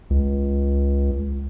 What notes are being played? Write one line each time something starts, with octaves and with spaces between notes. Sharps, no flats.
C#2